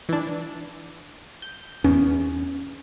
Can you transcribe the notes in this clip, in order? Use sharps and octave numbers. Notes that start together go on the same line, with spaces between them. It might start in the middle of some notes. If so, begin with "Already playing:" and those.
E3 D4
G6
E2 C#4